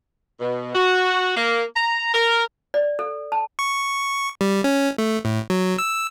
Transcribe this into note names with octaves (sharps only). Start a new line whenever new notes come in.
B2
F#4
A#3
A#5
A#4
D5
A4
A5
C#6
G3
C#4
A3
A2
F#3
E6